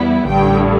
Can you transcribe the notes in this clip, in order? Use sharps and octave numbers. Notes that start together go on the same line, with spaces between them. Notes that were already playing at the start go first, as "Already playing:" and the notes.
Already playing: E2 G3 B3 E4
A1 G2 D3 G5